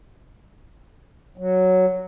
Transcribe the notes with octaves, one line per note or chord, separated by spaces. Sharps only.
F#3